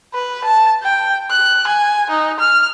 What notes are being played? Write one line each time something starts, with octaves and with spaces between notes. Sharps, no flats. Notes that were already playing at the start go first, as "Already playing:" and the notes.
B4
A5
G5
F#6
G#5
D#4
F6